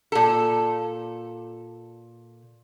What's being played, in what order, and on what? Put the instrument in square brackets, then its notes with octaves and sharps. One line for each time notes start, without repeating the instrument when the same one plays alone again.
[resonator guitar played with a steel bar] A#2 A4